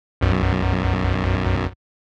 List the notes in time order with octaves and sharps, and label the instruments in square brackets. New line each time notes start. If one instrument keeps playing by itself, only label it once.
[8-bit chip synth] B1 F#2